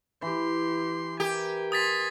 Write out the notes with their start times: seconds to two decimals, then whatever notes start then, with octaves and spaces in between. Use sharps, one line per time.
0.22 E3 G4 C6
1.20 G4 A#4 G#5
1.72 G#5 C6 D#6 A6 B6